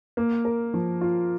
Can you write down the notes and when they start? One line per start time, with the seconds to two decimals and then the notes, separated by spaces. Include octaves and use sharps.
0.17 A#3
0.45 A#4
0.74 F3
1.01 F4